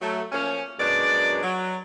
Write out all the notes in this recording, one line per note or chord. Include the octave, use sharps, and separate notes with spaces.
F#3 A3
F3 A#3 C#4
F#2 B2 G#3 D4 D5
F#3